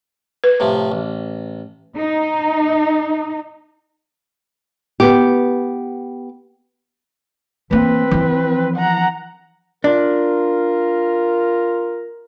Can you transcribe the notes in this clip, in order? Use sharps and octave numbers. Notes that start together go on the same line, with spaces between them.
B4
A2 C3 F3
A1
D#4
B3 G4
E3 A#3 C4 B4
E3 F3
F#5 A#5
D4 F4 A#4